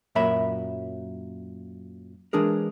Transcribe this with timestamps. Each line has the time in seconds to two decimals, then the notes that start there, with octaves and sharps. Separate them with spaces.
0.15 F#2 A#2 F#3 A#4 E5 B5
2.33 E3 G#3 D4 G#4 A#4